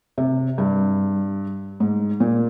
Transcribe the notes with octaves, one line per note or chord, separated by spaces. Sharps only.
C3
G2
G#2
A#2